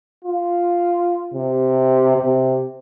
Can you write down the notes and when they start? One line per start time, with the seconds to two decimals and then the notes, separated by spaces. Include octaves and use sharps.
0.25 F4
1.34 C3
2.16 C3